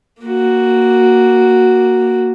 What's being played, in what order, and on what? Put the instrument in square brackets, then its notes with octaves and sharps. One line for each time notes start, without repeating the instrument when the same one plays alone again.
[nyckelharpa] A#3 F#4